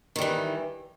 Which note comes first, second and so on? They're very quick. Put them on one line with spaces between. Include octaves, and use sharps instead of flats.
D#3 G3 E3